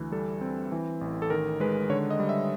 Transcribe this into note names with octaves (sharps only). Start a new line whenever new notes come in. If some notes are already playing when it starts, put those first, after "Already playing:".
Already playing: D2 E3
G3 A4
C4
E3
A1
A4
D#3 A#4
G#3 B4
D3 C#5
D#5
G3
E5